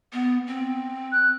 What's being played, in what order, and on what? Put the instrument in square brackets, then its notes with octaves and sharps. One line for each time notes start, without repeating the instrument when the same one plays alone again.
[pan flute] B3
C4
[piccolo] F#6